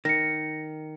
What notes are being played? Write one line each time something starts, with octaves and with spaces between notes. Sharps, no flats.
D#3 A#6 C#7